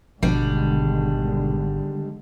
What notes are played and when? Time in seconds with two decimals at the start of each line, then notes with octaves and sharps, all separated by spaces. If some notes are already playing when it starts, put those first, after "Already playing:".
0.23 G#1 B2 D3 D#3 G3 G#3 B3 D4